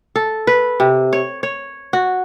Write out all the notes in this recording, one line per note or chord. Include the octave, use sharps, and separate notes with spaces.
A4
B4
C3
C#5
C#5
F#4